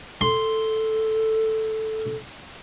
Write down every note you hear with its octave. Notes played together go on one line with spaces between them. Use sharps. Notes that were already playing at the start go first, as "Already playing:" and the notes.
A4 C6